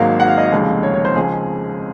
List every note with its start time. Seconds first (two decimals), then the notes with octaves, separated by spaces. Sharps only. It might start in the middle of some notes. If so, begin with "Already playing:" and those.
Already playing: G#1 G#2 F#3 A#3 F5
0.20 F#5
0.28 F5
0.38 D#5
0.46 F5
0.52 F1 D#2 C#3 G#3
0.83 C#5
0.94 C#5
1.05 C5
1.15 C#2 C#3 F3 G#3 G#4